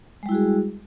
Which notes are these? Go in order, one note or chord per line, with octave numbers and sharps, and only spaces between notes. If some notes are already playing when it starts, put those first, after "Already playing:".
G3 G#3 E4 F#4 G#4